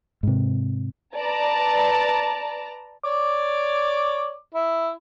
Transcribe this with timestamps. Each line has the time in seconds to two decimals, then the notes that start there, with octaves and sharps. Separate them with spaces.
0.23 G#2 C3
1.16 B4 D5 A5 A#5
3.04 C#5 D5 D6
4.55 E4